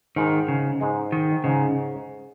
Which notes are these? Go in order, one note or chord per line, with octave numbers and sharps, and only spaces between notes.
G#2 D#3 G#3 D#4
C#3
G#2 G#3 D#4
D#3
G#2 C#3 G#3 D#4